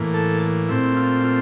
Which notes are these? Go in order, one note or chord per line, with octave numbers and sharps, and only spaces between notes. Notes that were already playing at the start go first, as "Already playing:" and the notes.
Already playing: A2 E3 A#3
A4
A#2 A3 C4 E4
F4
F4